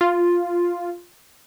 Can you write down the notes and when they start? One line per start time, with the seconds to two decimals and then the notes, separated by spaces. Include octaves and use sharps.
0.01 F4